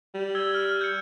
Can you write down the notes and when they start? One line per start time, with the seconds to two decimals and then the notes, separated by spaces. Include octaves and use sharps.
0.14 G3
0.35 E6 G#6 G7
0.54 F6
0.81 G6 C#7